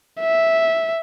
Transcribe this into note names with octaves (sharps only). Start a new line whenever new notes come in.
E5